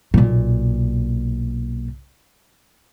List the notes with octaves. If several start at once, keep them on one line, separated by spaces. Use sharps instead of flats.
B1 A#2